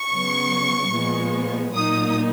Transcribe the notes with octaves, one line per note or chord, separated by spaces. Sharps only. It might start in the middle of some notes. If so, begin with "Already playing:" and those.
Already playing: C#6
C#3 F#3 B3
A#2 F3 G#3 B3
A#2 F#3 A#3 D#4 D#6